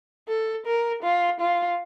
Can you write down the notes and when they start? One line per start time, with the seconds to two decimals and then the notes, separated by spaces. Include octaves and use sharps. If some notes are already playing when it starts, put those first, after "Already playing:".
0.28 A4
0.66 A#4
1.03 F4
1.40 F4